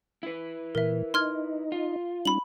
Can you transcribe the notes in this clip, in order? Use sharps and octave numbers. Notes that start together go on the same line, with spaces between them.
E4 B4
A#2 E3 A#4 E5
D#4 D#5 C6 F6 G#6
F4
G3 C#4 D#4 B5 F#7